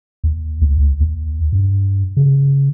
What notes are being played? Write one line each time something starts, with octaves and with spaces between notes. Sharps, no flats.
D#2
D2
C#2
D#2
G2
C#3